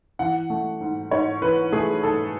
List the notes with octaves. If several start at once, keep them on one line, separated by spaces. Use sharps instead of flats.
E3 F#5
A3
G#2
G#2 C#5
E3 B4
A3 G#4
G#2 A4